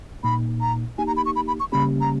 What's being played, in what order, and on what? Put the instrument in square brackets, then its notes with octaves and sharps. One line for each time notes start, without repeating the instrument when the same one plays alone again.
[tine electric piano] A#2 A#3 D#4 [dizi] B5
[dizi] A#5
[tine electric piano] A#3 D#4 G4 [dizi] G#5
[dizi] A#5
B5
C#6
B5
B5
C#6
[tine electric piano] C#3 G3 A#3 C#4 G4 [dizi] B5
[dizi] A#5